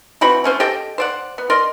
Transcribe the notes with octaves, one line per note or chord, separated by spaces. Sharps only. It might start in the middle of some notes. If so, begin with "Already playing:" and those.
E3 C4 F#4 B5
A3 C#4 C5
G4 A4 D#5 G5
C5 D5 F#5
B3
A#4 D5 D#5 C6